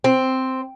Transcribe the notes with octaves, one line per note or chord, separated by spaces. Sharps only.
C4